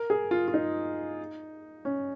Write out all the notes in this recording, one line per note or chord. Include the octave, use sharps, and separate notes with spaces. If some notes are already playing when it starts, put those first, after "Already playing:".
Already playing: A#4
G#4
F4
F4
D#4
C#4